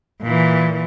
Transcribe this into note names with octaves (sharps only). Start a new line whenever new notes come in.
A#2 E3